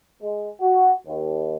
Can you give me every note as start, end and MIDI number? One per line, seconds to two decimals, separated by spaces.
0.22 0.47 56
0.60 0.92 66
1.06 1.55 39